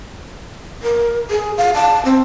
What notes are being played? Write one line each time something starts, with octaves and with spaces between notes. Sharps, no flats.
A#4
G#4
F5
A5
C4